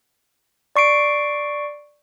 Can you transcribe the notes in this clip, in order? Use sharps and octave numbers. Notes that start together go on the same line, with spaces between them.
D5 C#6 C7 D7